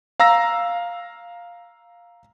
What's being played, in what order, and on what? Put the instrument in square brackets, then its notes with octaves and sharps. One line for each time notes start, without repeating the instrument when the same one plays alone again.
[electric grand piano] F5 A#5 E6 A#6